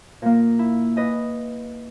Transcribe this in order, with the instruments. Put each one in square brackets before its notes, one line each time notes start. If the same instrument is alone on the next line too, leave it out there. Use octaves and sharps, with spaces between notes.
[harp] A#2 A#3
E4
B4 D#5 G#5